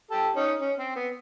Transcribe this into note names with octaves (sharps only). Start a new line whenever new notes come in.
G4 A4
C#4 D#4
C#4
C4
B3